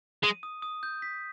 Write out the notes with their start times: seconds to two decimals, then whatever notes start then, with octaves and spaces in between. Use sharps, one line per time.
0.23 G#3 D#7
0.43 D#6
0.62 D#6
0.83 G6
1.02 B6